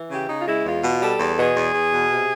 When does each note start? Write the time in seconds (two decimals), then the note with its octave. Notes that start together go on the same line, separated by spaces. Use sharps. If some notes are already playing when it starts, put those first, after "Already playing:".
Already playing: E3
0.10 C#3 G4
0.28 C#3 D#4
0.37 F4
0.46 G#3 E4
0.65 E2 F4
0.83 B2
1.01 G3 A4
1.19 E2
1.38 B2 G#4
1.56 E2
1.74 E2
1.93 B2
2.10 C3